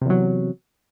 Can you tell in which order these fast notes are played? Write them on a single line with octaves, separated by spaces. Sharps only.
C3 E2 F#3